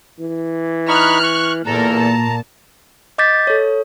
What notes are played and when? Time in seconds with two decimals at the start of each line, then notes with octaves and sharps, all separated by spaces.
0.19 E3
0.88 D#4 B5 C#6 F6 F#6
1.24 C#6
1.66 E2 A#2 A4 A#4 A#5
2.01 A5
3.18 D#5 D6 G6 A6 B6
3.47 A4 C#5